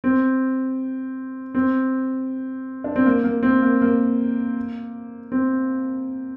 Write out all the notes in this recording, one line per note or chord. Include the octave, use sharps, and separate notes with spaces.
C4
C4
D4
C4
A#3
A#3
C4
A#3
A#3
C4